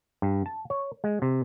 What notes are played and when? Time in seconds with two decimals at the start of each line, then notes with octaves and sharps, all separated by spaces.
0.22 G2
0.46 A5
0.70 C#5
1.04 G#3
1.22 C3